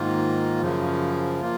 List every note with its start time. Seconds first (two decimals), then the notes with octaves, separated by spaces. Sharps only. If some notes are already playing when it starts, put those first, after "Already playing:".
Already playing: G#2 D#3 A#3 F4
0.61 F#2 C#3 F3
1.41 A#3 F4